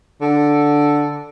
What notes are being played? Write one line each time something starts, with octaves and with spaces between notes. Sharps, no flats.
D3